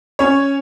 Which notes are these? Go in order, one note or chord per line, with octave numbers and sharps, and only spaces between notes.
C#4 C#5